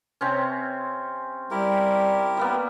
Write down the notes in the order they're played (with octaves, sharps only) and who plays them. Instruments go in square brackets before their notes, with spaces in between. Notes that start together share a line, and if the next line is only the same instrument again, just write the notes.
[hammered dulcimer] C3 C4 C#4
[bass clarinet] G3 [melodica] E4 G4 A#4
[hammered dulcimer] G3 A#3 B3